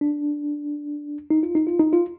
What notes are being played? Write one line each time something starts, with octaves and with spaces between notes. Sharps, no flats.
D4
D#4
F4
D#4
F4
D#4
F4